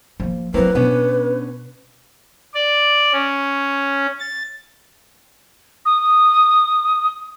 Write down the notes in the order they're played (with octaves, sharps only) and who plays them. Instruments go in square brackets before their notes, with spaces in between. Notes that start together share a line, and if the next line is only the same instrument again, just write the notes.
[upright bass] F3 A#3
[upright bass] F#3 E4 [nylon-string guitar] A#3 C4 [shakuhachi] B4
[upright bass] B2 [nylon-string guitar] B3 C#4 D4
[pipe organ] D5
C#4
A6
[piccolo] D#6